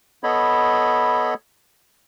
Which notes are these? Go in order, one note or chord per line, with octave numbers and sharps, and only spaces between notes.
B3 A4 C#5 D#5 B5